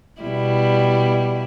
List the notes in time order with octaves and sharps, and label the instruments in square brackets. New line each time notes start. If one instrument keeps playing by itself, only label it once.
[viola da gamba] B2 G3 E4